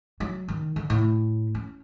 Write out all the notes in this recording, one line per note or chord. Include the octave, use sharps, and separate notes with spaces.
F#3
D#3
D3
A2
C#4